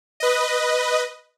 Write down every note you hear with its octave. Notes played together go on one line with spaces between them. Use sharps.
B4 D#5